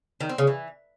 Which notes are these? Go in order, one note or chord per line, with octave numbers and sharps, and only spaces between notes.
D#3
C4
C#3
E3